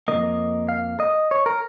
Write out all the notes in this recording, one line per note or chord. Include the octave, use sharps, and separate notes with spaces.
F2 D#3 A#3 D#5
F5
D#5
C#5
A#4